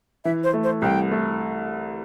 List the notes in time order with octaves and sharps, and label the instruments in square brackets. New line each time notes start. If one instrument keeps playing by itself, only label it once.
[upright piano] E3 [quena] E5
[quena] C5
[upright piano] A3
[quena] C5
[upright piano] C2 [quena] G5
[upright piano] A3